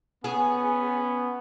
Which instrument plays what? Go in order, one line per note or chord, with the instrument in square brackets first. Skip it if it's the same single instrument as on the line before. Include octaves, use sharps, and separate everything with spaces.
[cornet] B3 [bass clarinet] C#4 [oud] G#4